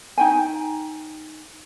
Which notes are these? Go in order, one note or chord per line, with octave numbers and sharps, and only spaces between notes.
D#4 G5 G#5